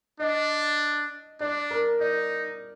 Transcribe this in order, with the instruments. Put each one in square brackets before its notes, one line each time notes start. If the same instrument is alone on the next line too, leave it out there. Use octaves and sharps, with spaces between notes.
[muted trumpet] D4 [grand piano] D#5
[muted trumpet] D4 [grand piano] D5
[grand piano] A#4
[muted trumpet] D#4 [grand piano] D5